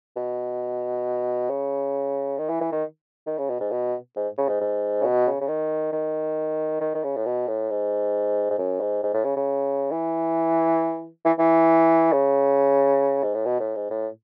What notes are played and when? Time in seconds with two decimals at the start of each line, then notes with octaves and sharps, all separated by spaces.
0.16 B2
1.50 C#3
2.38 D#3
2.49 E3
2.61 E3
2.72 D#3
3.26 D#3
3.38 C#3
3.50 B2
3.60 G#2
3.71 B2
4.16 G#2
4.38 C#3
4.48 G#2
4.60 G#2
5.00 C#3
5.04 B2
5.27 C#3
5.41 C#3
5.48 D#3
5.93 D#3
6.81 D#3
6.95 D#3
7.04 C#3
7.16 A2
7.25 B2
7.48 A2
7.70 G#2
8.50 G#2
8.58 F#2
8.81 G#2
9.03 G#2
9.14 A2
9.24 C#3
9.36 C#3
9.91 E3
11.25 E3
11.39 E3
12.12 C#3
13.23 G#2
13.34 A2
13.45 B2
13.60 A2
13.76 G#2
13.90 A2